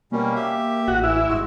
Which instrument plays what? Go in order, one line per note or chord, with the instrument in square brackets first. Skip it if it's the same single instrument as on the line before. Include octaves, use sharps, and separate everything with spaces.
[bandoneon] B2 G3 C#4 [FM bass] A#3
[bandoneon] G4 E5
[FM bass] A1 [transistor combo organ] F#4
[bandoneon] E3 [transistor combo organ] E4
[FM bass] G1 [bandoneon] G#3 F#4